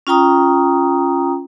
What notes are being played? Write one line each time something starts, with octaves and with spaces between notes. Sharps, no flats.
C#4 F4 G5 A#5 D#6